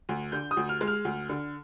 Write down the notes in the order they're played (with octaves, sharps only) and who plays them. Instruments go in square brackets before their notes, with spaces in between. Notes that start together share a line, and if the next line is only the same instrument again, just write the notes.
[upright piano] D2
D3 G6
D#6
D2
F6
G#3
F6
D2
D3